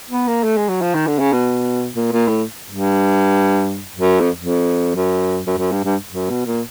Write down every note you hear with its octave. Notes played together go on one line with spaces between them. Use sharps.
B3
A#3
A3
G#3
F#3
F3
D#3
D3
C#3
B2
A#2
A#2
A2
G2
F#2
F2
F2
F#2
F#2
F#2
G2
G2
F#2
B2
A#2